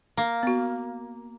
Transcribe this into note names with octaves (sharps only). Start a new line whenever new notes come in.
A#3
B3 F#4